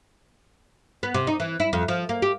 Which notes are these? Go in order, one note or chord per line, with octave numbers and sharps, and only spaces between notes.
B3
C3
D#4
E3
E4
F2
F3
A#3
G4